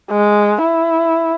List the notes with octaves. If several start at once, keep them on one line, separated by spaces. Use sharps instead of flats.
G#3
E4